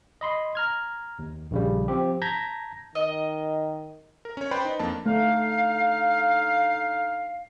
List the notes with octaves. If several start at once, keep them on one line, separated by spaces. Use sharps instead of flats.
D#5 B5 C6
A#5 F6 G#6
D#2
A#1 C#3 G3
F3 C4 G4
A5 A#5 G6 G#6 A#6 B6
D#3 D#5
A#4
C#4 C#5
B4 C5 D5 G5 B5 C6
D#4
F2 A#3 D4 A5
D3 A3 D#4 F5